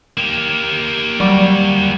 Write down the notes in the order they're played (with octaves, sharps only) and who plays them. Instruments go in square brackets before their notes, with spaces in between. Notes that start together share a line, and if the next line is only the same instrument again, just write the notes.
[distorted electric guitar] A#3 G4
[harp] F#3 D6 [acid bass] G3